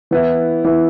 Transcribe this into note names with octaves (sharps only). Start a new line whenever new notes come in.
E3 B3 E4
E3 B3 E4